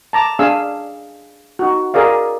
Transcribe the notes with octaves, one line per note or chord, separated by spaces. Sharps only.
A5 A#5 D6
D4 G#4 F5 G#5 E6
D#4 F#4
G#4 A#4 D5 F5